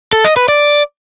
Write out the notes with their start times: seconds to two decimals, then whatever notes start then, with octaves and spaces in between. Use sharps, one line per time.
0.13 A4
0.25 D#5
0.37 B4
0.48 D5